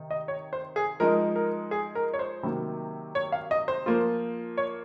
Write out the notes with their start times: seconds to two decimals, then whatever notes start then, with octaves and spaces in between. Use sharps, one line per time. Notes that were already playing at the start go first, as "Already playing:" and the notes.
Already playing: C3 D#3 D#4
0.11 D#5
0.28 C#5
0.53 C5
0.76 G#4
1.00 F3 G#3 D#4 A#4
1.36 A#4
1.71 G#4
1.95 A#4
2.14 C#5
2.19 C5
2.43 C3 D#3 F#3 A#3
3.15 C#5
3.32 F5
3.51 D#5
3.68 C5
3.86 F3 A#3 F4
4.58 C#5